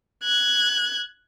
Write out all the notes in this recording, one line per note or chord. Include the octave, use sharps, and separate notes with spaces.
F#6 G#6